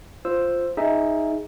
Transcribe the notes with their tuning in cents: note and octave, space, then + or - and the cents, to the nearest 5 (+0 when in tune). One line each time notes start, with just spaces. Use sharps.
F4 +0 C5 +0 E6 +0
D#4 +0 G#4 -5 E5 +0